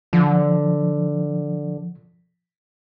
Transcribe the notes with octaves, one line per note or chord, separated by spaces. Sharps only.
D3 F3